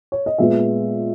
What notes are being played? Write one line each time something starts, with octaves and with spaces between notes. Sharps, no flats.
C#5
D#5
A#2 G#3 B3 E5